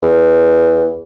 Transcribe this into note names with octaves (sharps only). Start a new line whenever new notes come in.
E2